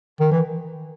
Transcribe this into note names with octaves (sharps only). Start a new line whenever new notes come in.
D#3
E3